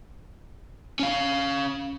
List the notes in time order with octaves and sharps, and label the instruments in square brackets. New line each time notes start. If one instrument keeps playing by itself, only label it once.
[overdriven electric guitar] C#4 F5